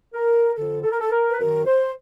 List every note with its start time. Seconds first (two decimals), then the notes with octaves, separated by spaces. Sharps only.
0.14 A#4
0.56 F2 D3 A4
0.83 A4
0.91 A#4
1.00 A4
1.12 A#4
1.30 B4
1.39 F#2 D#3 A#4
1.67 C5